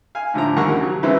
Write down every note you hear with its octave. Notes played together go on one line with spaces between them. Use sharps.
F5 G#5
A2 D3 F3 A#5
D#2 D#3 F3 A#4 F#5 C#6
C#3
F#3
C#3 E3 G#3 C4 D#4